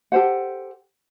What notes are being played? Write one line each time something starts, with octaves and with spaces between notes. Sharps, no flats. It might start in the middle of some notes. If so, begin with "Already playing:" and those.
G4 A4 C5 F#5